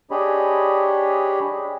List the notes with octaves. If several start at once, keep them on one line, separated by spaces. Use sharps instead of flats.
D4 G4 G#4 C#5 D#5 B5